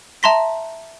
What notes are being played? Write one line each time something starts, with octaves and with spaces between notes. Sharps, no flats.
E5 A5 A#5 C6 A#6 B6